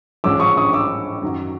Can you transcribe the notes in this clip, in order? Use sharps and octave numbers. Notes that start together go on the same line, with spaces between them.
A1 G#2 F3 G#3 C#4 D6 E6
C#6 D#6
C#6 D#6
D6 E6
F#2 D#3 F#3